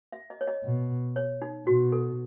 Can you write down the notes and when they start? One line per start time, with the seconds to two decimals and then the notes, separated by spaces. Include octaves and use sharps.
0.12 E5
0.30 D#5
0.41 C#5
0.47 D#5
0.64 B2
1.16 C#5
1.42 D#4
1.66 B2 F#4
1.92 A4